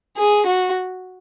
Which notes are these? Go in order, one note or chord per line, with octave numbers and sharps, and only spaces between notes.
G#4
F#4